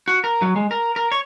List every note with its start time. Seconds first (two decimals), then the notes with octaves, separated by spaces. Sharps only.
0.08 F#4
0.24 A#4
0.42 F#3
0.56 G#3
0.71 A#4
0.96 A#4
1.12 C#5